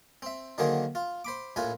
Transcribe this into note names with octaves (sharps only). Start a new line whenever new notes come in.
C4 E5
D3 D#3 F#3 A#3 G#4 C5
F4
C5 B5 D6
A#1 A2 F4 B4 G#5